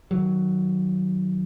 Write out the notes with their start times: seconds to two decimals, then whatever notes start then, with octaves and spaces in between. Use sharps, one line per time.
0.11 D#3 F#3